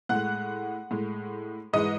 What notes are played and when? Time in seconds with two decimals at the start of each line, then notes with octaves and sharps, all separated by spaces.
0.09 A2 G#3 F#5 F#6
0.91 A2 G#3
1.73 G#2 E3 G#3 D#5 D#6